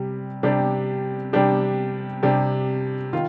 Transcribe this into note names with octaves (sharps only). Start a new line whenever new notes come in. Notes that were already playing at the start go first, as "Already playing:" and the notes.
Already playing: C3 G3
C3 G3 D4 G4
C3 G3 D4 G4
C3 G3 D4 G4
D#3 F4